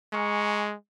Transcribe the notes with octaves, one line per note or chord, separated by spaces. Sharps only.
G#3 G#5 A#5 C#6